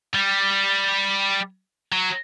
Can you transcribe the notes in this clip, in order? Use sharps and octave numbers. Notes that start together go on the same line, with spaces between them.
G3
F#3